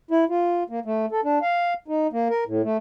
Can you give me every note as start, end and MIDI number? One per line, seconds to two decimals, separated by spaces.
0.11 0.24 64
0.29 0.63 65
0.70 0.80 58
0.85 1.06 57
1.11 1.21 69
1.24 1.39 62
1.42 1.74 77
1.88 2.07 63
2.12 2.28 58
2.30 2.44 70
2.47 2.62 45
2.63 2.77 57